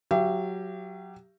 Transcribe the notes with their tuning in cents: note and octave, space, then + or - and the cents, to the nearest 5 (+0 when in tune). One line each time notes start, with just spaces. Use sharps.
F#3 +0 G4 +0 E5 +45